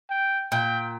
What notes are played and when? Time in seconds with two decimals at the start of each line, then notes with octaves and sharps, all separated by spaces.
0.10 G5
0.52 A#2 G5